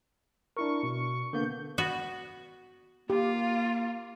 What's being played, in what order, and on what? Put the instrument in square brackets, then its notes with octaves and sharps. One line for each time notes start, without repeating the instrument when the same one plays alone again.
[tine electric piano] D4 E4 A#4 [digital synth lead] C#6
[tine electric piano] B2
[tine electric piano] D3 A#3 B3 [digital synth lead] G6
[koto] B3 F#4
[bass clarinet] A#3 [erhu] F4 [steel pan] G4